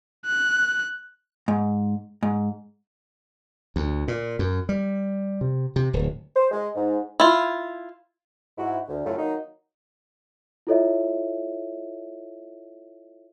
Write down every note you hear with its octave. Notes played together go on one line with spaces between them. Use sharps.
F#6
G#2
G#2
D2
A#2
F#2
G3
C3
C3
D1
C5
G#3
G#2
E4 F4
G#2 E4 F#4
D2
F#2 A2 C#3 F#3 A3 F4
D#3 F#3 A#3 D#4
E4 F4 A4 C#5 D#5 E5